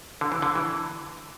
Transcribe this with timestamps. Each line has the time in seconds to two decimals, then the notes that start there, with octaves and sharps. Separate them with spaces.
0.21 D3
0.32 E3
0.42 D3
0.55 E3